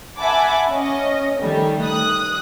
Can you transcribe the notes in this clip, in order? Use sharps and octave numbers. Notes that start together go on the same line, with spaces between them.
E5 F#5 G#5 A5 B5 D6
C#4 D#5
D#3 G3 A3
D#6 F#6